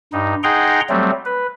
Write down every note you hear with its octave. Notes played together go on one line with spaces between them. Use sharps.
G2 D#4
D#4 G#4 F#5 G5 A#5 C6
F#3 G3 A3 C4
B4